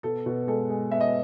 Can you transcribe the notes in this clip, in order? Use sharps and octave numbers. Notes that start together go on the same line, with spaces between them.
B2 A4
B2
G#3 A4
G#3
B3 E5
D#5